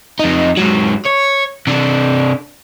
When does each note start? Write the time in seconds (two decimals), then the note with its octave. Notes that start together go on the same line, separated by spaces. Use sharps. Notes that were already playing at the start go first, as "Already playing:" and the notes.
0.19 F2 D#4
0.57 G#2 F#3
1.05 C#5
1.67 C3 D4